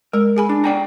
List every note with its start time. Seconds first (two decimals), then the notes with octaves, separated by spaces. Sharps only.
0.13 G#3 A#4
0.37 G#4 G#5 B5
0.49 D4
0.64 D5 G5 A#5